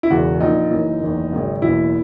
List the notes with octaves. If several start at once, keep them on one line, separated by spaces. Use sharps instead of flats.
E4
E1 E2 C#3 F#4
A#1 A#2 D#4
F#1 F#2 E3
F#1 E2 D#3
G#1 F#2 C#3
F#1 E2 B2 E4